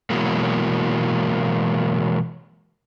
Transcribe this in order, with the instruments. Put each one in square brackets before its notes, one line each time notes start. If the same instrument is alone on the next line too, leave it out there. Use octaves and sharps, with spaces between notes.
[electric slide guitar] B2 E3 F#3 G#3 A#3